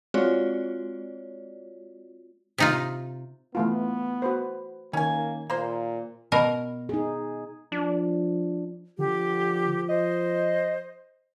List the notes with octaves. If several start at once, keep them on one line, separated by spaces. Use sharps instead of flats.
G#3 C4 F4 F#4 C#5 D5
C3 D#4 F4
E3 A3 B3 F4
F#4 B4 C5
D#3 A#3 C#4 G#5
A#2 A#3 C5
B2 A#4
D#4 G#4
F3 D4
D3 F3 G4
C5 D#5